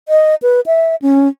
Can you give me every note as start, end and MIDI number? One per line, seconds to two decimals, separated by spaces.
0.09 0.35 75
0.42 0.60 71
0.66 0.96 76
1.02 1.29 61